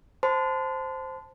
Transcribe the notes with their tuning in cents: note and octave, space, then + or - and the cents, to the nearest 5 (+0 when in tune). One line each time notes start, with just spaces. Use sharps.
C5 +0 A5 +0 C6 -35